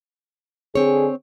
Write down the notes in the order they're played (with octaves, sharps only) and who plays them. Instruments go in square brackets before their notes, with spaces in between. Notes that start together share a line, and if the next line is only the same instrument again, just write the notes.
[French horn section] D3 G#4 [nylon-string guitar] C4 C#5